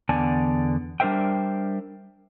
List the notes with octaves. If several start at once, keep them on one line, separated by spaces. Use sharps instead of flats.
E2 D3 B3 D5 G#5 A5
G3 D4 A#4 C5 E5 G5